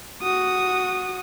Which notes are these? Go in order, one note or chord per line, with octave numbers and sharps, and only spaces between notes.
F#4 D#6